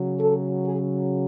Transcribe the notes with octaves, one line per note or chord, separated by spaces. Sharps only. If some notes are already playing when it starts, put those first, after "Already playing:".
Already playing: C#3 F#3
A4
G#4